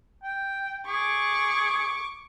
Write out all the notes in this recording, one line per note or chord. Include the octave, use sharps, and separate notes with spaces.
G5
G#4 C#6 D6